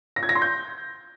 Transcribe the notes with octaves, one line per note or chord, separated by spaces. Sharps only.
A#6
G#6
A#6
C6
G6